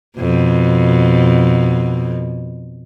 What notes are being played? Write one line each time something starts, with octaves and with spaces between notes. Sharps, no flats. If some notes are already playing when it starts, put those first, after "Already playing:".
F2 B2